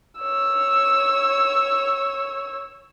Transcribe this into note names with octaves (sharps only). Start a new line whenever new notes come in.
C#5 E6